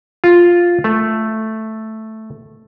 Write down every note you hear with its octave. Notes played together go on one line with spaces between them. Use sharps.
F4
A3